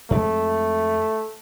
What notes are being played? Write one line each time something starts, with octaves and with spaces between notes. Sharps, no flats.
F2 G#3 A3